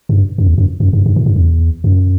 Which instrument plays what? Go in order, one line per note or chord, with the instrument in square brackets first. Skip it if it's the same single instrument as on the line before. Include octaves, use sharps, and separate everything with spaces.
[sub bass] G2
F#2
E2
F#2
F#2
G2
G2
A2
G2
E2
F#2